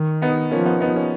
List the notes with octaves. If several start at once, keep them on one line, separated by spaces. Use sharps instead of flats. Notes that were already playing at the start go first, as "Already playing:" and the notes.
Already playing: D#3
B3 D#4
F3 A#3 C#4
B3 D#4
B3 D#4
A#3 C#4